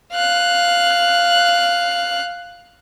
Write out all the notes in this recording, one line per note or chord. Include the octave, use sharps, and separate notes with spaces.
F5 F#6